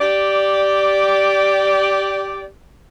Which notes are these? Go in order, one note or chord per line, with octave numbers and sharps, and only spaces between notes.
G4 D5